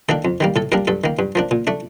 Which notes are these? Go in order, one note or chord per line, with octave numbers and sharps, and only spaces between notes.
D#3 A#3 D4 A4
F2
D#3 G3 A#3
A2 A4
G3 A#3 D4 A#4
G2 A4
D#3 A#3
G2
F3 A#3 D4
A#2
A3 D4